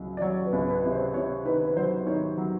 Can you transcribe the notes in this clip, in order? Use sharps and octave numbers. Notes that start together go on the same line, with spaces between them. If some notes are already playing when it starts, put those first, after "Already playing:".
Already playing: C#2 F#3
D5
F#3 C#5
B4
C#2
B4
C3
C5
C3 C#5
D#3 B4
B4
F#3 C5
D#3 C#5
F#3